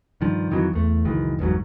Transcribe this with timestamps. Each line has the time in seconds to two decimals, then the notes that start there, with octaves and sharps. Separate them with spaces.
0.21 G2 D#3 F3
0.51 F2 D#3 E3 F#3
0.73 E2 A3
1.05 F#1 C#2 D#3 E3
1.39 G1 E2 G#2 F#3